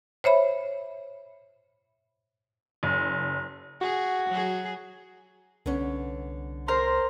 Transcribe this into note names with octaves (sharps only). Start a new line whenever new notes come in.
C5 C#5 E5 B5
F#1
F#4 G#4
F#3 G#4
C2 D3 B3 C#4
A#4 C5 C6